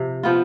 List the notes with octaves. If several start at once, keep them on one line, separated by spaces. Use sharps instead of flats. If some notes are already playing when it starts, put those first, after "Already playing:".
Already playing: C3 F3
F3 B3 F4